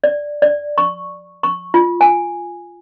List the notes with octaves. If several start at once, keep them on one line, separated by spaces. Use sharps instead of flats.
D5
D5
C#6
C#6
F4
G#5